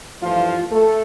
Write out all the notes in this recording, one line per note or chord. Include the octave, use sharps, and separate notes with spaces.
G2 E3 F3 A3 F4
A3 A4